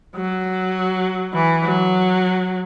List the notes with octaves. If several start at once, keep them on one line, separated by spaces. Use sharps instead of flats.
F#3
E3
F#3